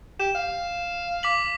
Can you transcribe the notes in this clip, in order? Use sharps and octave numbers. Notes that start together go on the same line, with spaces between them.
G4 E7
F5
D6 B6 F#7